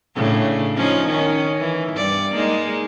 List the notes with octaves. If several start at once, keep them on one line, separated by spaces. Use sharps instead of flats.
A2 C#3 D4
F3 C#4 D#4
D#3 C#4
E3
G2 D5
G#3 A#3 D#4